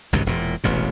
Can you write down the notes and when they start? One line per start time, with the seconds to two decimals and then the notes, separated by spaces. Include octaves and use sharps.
0.13 G#1 C#2 G2 C3
0.26 E1 A#2
0.64 E1 A1 C3